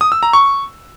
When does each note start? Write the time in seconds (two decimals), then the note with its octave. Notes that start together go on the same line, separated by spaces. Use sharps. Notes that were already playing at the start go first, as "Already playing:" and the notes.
0.01 D#6
0.12 E6
0.23 A#5
0.33 C#6